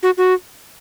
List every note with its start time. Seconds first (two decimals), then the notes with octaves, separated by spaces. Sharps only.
0.03 F#4
0.18 F#4